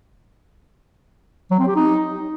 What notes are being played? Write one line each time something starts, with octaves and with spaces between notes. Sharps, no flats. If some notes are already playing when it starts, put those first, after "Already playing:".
F#3
C4
G4
D#4